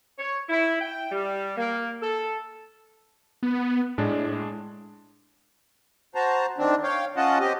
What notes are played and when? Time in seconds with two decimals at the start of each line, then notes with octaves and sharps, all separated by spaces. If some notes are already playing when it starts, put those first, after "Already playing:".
0.19 C#5
0.49 E4
0.81 G5
1.12 G3
1.57 A#3
2.03 A4
3.43 B3
3.98 A2 G#3 D4
6.15 F#4 C5 A5 A#5
6.58 D#3 C4 D4
6.83 C#5 F5 G5
7.16 C#4 F4 D#5 F#5 A5
7.40 C4 G4 D#5